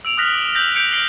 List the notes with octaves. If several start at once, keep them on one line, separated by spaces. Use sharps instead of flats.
E6 D7 F7
D#6 F6 F#6 A#6 B6 F#7
D6
E6 G6 A#6 F#7
F#6 G6 C#7 D7 F7
F6 B6 C7 D7 F#7 G7